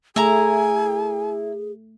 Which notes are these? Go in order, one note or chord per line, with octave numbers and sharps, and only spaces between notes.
A3 E4 G#4 G#5 A#5